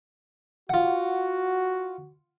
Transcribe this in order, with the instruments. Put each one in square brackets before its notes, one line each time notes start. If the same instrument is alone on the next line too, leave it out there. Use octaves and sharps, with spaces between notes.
[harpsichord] F4 F#5 [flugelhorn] F#4